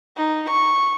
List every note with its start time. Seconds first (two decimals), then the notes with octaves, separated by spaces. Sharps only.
0.17 D#4
0.50 C#6